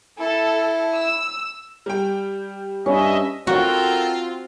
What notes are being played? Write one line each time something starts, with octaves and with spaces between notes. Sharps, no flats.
E4 A4
E6
G3 G5
G2 C#4 D#5 E5
C4 F4 F#4 A4 A#4 G5